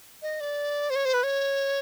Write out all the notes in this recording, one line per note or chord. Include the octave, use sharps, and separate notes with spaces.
D#5
D5
C5
C#5
C5
B4
C#5